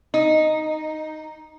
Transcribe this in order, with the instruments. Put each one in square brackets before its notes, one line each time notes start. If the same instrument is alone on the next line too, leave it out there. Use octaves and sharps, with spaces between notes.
[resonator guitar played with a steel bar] D#4